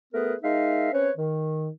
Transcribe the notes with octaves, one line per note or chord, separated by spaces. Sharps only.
A3 B3 G#4 A#4 B4
G#3 D#4 A#4 E5 F5
C4 C#4 B4 C#5
D#3